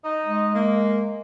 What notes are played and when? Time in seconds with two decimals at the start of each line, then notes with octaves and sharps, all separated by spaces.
0.04 D#4 D#5
0.25 G#3
0.54 A#3